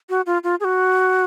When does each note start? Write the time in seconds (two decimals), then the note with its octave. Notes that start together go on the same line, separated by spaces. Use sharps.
0.09 F#4
0.26 F4
0.44 F4
0.60 G#4
0.64 F#4